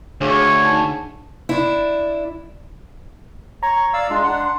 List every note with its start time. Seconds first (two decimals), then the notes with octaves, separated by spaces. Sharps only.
0.21 D2 D4 G#4 C#5 F5
0.64 D4 D#4 A5
1.49 D4 E4
3.63 C#5 A#5 C#6
3.93 D5 F5 E6
4.10 G#3 D4 F4
4.24 D4 F#5
4.40 C6